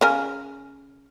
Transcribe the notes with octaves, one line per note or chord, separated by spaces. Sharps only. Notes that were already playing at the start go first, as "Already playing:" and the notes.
C#3 A#4 G#5